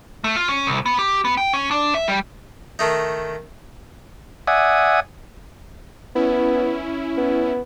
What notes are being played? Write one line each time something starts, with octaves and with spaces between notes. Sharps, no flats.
A3
F4
C#4
C2
B3
G4
B3
G5
C#4
D4
E5
G3
D#3 A3 D#4
D5 E5 F#5 G#5 D#6
B3 C#4 E4
B3